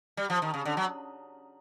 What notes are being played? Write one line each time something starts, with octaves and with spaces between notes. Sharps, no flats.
G3
F3
D#3
C#3
D3
F#3